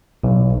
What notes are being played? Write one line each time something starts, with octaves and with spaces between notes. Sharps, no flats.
B1